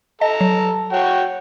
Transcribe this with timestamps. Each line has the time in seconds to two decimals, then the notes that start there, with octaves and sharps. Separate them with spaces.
0.21 A4 D#5 A#5
0.41 F#3
0.93 F#4 C#5 G5